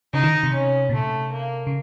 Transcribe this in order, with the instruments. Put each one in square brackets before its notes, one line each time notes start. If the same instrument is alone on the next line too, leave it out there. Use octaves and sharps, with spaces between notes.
[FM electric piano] C#3 [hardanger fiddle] D#4
[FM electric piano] D#3
C3
[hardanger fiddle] C#4
[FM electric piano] A#2
[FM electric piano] C3 [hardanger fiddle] A3
[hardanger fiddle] A#3
[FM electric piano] C#3